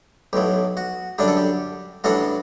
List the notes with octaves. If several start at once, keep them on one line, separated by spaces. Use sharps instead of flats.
B1 A2 F#3 G4
F#4
F#2 D3 G3 D4 G4
A4
G4
A1 A2 G3 D4 F#4 A4